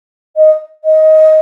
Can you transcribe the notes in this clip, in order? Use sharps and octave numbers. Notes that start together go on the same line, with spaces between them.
D#5
D#5